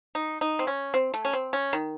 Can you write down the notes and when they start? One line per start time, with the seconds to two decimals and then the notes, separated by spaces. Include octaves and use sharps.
0.15 D#4
0.41 D#4
0.59 C4
0.67 C#4
0.94 C4
1.14 A3
1.25 C#4
1.33 C4
1.53 C#4
1.73 D#3